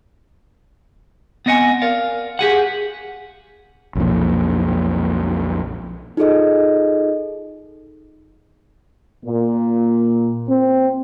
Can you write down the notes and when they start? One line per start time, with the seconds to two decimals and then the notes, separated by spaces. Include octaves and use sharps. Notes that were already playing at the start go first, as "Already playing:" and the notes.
1.46 B3 C4 D#5 F#5 G#5
1.82 A#4 D5 F5
2.39 G4 G#4 F#5
3.95 B1 F2 A#2
6.17 D#4 F4 G#4 A4 D#5
9.25 A#2
10.48 C4